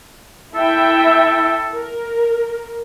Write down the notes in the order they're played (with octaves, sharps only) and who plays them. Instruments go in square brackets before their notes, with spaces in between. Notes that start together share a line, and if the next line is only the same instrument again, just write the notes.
[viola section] E4 E5 G5 [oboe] A4
[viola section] A#4